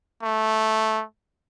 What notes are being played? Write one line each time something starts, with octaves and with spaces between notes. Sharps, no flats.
A3